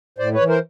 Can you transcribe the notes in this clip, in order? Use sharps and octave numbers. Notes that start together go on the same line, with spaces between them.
A2 C5 D5
B4 C#5
E3
A#4 C5